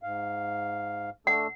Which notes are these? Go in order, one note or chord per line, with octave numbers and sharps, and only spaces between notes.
G#2 F5
A3 D4 A4 F#5